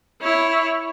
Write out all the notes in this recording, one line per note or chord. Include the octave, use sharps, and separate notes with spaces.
E4 C#5